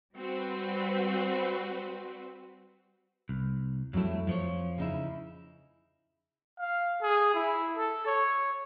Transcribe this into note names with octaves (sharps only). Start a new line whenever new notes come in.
G3 C4 F#4 B4
C2
F2 F#3 G3 A3 E4
F2 F3 F4 C#5
C#3 D#4 E4
F5
G#4
E4
A4
C#5